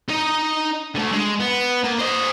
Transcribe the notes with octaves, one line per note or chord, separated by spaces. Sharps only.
D#4 D#5
D3 A3
G#3
B3
A#3
C5 D#5